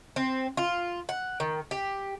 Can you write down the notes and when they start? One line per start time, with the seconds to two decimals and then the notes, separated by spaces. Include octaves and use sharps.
0.16 C4
0.57 F4
1.09 F#5
1.40 D#3
1.71 G4